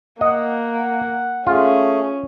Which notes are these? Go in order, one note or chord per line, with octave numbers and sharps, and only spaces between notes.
A#3 D#5 F#5
A3 C#4 F4 G#4